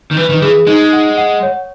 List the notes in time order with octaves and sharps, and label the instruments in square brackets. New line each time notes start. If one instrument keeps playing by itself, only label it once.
[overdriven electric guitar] D#3
[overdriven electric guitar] E3 [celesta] B4
[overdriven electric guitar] D#3
[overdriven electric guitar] E3 [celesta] G#4
[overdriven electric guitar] G#3 [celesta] D#4
[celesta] F#5
F#5
C#5